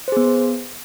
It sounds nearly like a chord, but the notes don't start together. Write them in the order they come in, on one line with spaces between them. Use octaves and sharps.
C5 G#4 B3